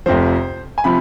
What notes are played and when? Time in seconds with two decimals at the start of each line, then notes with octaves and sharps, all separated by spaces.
0.06 F1 F2 C3 F3 C5
0.78 G#5
0.84 C3 F3 B5